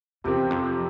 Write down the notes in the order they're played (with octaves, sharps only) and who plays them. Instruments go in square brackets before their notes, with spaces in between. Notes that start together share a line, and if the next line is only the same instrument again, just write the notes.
[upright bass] E2 [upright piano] C3 F3 C4 G4
[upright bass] F2